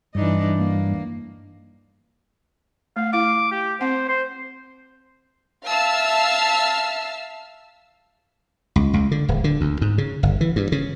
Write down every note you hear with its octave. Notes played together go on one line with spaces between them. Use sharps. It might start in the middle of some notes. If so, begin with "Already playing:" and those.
G2 E3 D4 D#4
A#3
A3 F5
E4 F5 D6
G4
C4 C5 F#5
C5
E5 F5 A5 E6 F6
C#2
C#2
D3
D1
D3
D2
G#2
C#3
G1
E3
G2
C#3